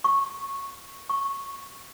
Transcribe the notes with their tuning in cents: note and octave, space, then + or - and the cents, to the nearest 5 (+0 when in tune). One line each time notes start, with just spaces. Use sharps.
C#6 -10
C#6 -5